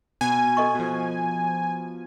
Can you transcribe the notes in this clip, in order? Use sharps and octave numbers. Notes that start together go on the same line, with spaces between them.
B2 G#5
A4 D#5 C#6
B2 F3